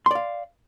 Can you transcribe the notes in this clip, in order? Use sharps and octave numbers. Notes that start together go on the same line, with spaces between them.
D5 F5 C6